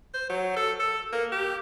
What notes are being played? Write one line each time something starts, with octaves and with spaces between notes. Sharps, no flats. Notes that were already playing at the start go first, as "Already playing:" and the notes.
C5
F#3
A4
A4
A#3
G4